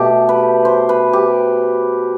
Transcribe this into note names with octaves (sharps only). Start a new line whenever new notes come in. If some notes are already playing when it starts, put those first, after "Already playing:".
Already playing: B2 A3 G4
B4
C5
B4
G4